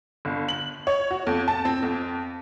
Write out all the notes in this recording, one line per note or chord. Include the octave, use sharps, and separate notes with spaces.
G1
F#7
C#5
F#4
F2
A5
C4
F2